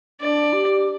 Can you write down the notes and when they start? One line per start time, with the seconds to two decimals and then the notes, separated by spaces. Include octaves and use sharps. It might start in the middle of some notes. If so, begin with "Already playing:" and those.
0.21 D4 D5
0.53 G4